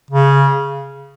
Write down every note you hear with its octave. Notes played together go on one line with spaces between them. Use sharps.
C#3